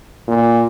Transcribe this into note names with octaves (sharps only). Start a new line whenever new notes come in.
A#2